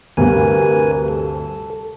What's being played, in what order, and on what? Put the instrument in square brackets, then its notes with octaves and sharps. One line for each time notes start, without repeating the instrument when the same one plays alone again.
[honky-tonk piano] D2 G2 C3 [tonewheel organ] A#4 B4 G#5
[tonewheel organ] A4